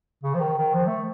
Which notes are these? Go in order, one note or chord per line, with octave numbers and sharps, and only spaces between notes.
C#3
F3
D#3
D#3
F3
A3